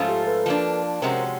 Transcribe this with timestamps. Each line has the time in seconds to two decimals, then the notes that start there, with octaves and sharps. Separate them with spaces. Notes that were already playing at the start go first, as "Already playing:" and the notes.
Already playing: G#2 F3 A3 C#4 F4
0.08 G4 A4
0.27 A4 B4
0.46 F3 A#3 D4
1.02 C3 F3 G#3 C#4 F#4 A#4 C5